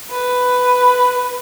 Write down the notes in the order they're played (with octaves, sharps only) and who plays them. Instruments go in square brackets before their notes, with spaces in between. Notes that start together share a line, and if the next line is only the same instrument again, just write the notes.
[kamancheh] B4